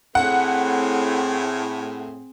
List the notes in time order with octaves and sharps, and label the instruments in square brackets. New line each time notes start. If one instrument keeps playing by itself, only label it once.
[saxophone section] A2 [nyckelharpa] C4 G#4 [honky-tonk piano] F#5